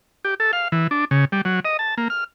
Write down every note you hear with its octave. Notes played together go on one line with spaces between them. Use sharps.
G4
A4
F5
E3
D4
C#3
G3
F#3
D#5
A5
A#3
F6